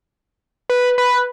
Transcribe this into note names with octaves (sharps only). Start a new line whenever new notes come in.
B4
B4